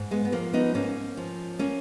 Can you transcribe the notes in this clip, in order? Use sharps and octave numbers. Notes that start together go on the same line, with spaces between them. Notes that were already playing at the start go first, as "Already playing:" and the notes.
Already playing: G#2
G#3 B3
B3
F3 A#3
B3 D#4
G#2 A#3 C#4
F3
A#3 C#4